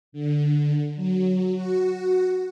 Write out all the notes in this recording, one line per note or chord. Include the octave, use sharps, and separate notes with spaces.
D3
F#3
F#4